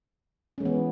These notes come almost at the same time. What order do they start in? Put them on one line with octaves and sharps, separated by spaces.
C#4 G#3 E3 B3